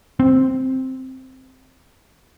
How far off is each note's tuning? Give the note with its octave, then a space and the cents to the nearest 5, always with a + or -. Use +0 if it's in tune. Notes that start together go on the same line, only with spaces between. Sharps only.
C4 +0